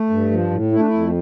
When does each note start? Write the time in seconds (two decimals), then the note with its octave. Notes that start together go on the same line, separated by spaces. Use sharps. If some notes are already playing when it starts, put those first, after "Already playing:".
Already playing: A3
0.10 G2
0.31 F3
0.51 A2
0.72 A3 E4
0.79 D4
0.87 E4
0.93 F2